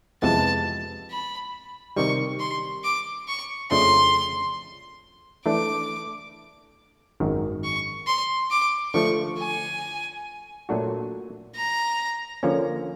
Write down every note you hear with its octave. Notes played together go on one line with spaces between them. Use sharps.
F2 C3 E3 G#3 B3 A5
B5
C3 D#3 G3 C#6
C6
D6
C#6
F2 C#3 F3 A3 D4 C6
E3 A3 D4 D6
G#1 F#2 D#3
C#6
C6
D6
D3 F3 A3 C#6
G#5
A#2 F#3 A3 D4 F#4
A#5
D3 F3 A#3 C#4